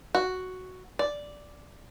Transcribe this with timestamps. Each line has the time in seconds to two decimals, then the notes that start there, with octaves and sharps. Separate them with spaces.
0.15 F#4
0.99 D5